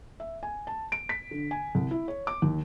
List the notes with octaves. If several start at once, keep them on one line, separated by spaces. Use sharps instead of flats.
E5
G#5
A5
D7
B6
D3
G#5
C2
E4
C#5
D6
D#2